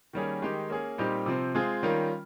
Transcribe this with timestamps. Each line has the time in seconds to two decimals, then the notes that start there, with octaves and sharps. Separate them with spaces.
0.13 D#3 G3 A#3 C#4 G#4
0.42 D#3 G#3 D#4 G4
0.70 A#3 C#4 G#4
0.98 A#2 G3 C4 D#4 G4
1.26 C3 F3 C4
1.55 G#3 C4 F4 G#4
1.83 D#3 G3 C#4 F4 A#4